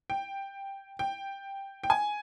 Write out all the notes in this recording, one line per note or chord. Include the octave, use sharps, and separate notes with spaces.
G5
G5
G5
G#5